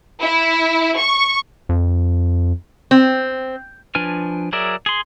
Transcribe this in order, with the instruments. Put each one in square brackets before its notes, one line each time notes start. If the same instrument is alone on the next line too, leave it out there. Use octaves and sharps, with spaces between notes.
[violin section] E4
C#6
[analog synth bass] F2
[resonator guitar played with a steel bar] C4
[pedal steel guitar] F3 D4 B4 G#5 F6
F#3 G#4 A#4 D5 E5
G#4 C6